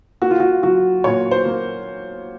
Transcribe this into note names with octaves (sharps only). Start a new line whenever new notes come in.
A#3 F#4
F4
F#4
F#3 F#4
A#2 C#5
C5
A#3